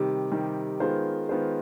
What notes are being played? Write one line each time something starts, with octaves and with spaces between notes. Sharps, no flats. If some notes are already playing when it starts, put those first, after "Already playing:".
Already playing: C3 D#3 G3
C3 D#3 G3
D#3 G#3 B3 F4 C5
D#3 G#3 B3 F4 C5